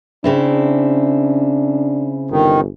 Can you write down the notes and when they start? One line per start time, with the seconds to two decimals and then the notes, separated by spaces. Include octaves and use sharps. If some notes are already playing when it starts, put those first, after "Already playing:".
0.24 C#3 C4 D4 E4
2.31 G1 D#3